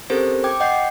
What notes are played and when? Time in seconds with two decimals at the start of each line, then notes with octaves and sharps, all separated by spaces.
0.10 C4 C#4 G4 A4 A#4 C5
0.44 G5 D6 G#6
0.60 D#5 F#5 G5 G6 C7